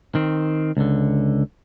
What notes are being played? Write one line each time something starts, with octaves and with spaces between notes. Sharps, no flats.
D#3 C4
C#2 D3